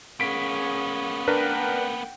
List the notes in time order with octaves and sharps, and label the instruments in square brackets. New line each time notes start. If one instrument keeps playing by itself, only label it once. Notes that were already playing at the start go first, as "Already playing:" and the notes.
[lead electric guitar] A#3 B3 [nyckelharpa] C#4 G#4 [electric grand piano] B6 D7
[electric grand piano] D4 A#4 B4 [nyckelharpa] F#5 G5